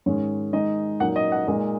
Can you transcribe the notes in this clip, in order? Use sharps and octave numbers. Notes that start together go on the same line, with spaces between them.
G#2 D#3 G#3 C#4 C#5
D#3 G#3 D#4 D#5
A#2 F#3 A#3 D#4 F#5
D#5
F#5
A#2 G#3 D#4 D#5